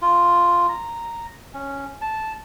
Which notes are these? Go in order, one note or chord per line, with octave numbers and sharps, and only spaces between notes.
F4
A#5
C#4
A5